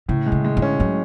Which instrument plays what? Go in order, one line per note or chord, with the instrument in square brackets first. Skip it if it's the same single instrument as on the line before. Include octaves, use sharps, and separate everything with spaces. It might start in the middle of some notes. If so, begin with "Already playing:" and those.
[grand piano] A2 [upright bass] C#3
[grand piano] G#3
[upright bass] C#3
[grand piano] G#3
[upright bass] D3
[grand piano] C#4
[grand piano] A2 [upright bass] F#3